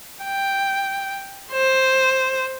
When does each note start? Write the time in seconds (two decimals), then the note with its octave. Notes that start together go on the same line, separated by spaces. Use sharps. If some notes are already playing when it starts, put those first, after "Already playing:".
0.24 G5
1.52 C5